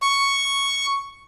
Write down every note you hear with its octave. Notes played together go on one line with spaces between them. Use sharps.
C#6